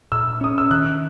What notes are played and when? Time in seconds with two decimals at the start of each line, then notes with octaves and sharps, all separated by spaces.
0.12 A#2 E6
0.41 C#4 D#6
0.58 E6
0.70 D#3 F#6